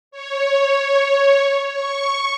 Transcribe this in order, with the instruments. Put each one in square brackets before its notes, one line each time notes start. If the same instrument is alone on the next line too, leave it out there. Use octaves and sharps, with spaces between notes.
[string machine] C#5
C#6